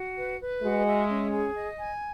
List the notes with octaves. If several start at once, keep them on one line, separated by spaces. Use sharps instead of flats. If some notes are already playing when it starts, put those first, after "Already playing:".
Already playing: F#4
B4
B4
G#3 F#4
E5
C#4
G#4
D#5
G#5